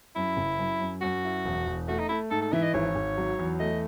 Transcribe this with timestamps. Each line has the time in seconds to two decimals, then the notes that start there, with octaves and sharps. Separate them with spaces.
0.16 F#2 E4
0.37 F#1
0.59 F#2
0.80 F#2
1.01 F#2 F#4
1.24 E4
1.45 E1
1.67 E1
1.88 A3 F#4
1.99 D#4
2.09 A3 E4
2.31 G#2 A4
2.42 A4
2.53 E3 E5
2.63 D#5
2.74 G#1 C#5
2.95 G#1
3.17 F#3
3.39 E2
3.60 A3 D#5